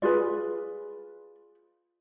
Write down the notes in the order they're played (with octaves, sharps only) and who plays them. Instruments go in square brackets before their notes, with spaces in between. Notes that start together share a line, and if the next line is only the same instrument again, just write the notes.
[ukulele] F4 G#4 B4 D5